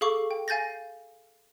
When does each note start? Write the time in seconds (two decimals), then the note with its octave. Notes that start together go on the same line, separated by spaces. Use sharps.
0.01 G#4 A4 F5 C#6 D6
0.31 G5
0.48 F5 G#5 G6 A6 A#6